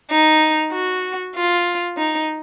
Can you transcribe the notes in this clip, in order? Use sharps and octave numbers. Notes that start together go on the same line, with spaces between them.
D#4
F#4
F4
D#4